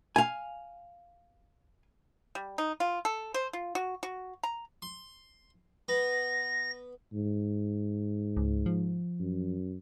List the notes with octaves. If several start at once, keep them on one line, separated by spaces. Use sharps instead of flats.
F5 G#5
G3
D#4
F4
A4
C5
F4
F#4
F#4
A#5
C6
B3 A#6
G#2
C#2
F3
F#2